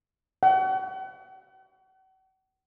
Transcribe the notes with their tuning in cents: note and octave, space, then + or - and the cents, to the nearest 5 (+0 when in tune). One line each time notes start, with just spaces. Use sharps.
F#5 +45